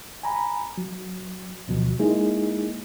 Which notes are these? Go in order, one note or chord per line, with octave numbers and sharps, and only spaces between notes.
G#5 A#5 B5
F#3
D2 B2 F3 F#3
G#3 A#3 D#4 E4 G#4